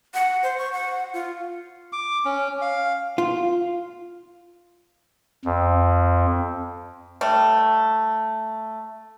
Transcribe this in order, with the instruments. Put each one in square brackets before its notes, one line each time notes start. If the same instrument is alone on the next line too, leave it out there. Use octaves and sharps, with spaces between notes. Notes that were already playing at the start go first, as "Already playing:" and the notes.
[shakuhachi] F#5
C5
C#6
F#5
F4
[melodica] D6
C#4
F5
[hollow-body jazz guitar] F4
[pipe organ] F2
[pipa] G3 A3